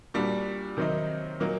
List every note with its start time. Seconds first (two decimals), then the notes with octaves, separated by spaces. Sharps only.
0.14 A#2 G3 D4 F#4
0.77 C3 D#3 F#3 C4 D#4
1.40 A#2 F#3 A#3 D#4